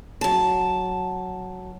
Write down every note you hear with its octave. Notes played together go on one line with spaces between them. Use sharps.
F#3 A5